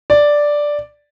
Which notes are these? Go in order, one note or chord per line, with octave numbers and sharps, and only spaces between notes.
D5